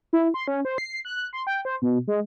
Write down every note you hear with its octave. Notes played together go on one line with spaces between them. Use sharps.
E4
C6
C#4
C5
C7
F#6
C6
G5
C5
B2
G#3